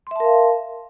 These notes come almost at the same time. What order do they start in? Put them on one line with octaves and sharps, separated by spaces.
C6 E5 A5 A#4 F5